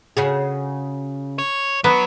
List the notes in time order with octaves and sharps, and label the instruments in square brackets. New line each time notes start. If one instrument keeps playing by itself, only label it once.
[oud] C#3 F#4 G#4
[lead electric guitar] C#5
[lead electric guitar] F#3 [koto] B3